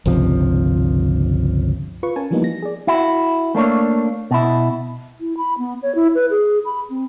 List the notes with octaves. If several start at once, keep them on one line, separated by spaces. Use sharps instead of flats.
G1 C#2 C3 F3
F4 B4 C#6
C#4 A#4 G#5 A5
E3 F3 G3 A#3 B3 D#4
A#6
G#4 D5
E4 F#4
A3 A#3 D4 C#5
B2 E4
E4
B5
B3
C#5
E4
B4
G#4
B5
C4